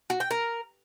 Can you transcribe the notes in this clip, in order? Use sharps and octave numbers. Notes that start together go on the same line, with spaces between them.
F#4
G5
A#4